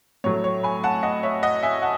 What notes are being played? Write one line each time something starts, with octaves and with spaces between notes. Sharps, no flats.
A2 F#3 A3 C#5
C#5
G#5 B5
F#5 A5
D#5 F#5
C#5 E5
D#5 F#5
E5 G#5
F#5 A5